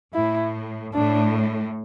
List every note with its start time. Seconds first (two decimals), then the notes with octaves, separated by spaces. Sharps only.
0.14 A2 E4
0.94 A2 D4